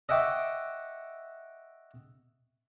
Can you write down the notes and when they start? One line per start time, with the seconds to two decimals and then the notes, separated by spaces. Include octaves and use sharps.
0.09 D#5 E5 F#5 G5 C#6 D6